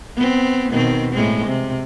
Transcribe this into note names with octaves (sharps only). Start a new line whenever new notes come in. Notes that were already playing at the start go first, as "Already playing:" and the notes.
B3 C4
B2 D#3 C4
A2 G#3 C4
C3